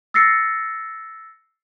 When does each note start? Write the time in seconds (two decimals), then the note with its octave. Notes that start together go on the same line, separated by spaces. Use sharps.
0.14 E6 A6 A#6 C7 C#7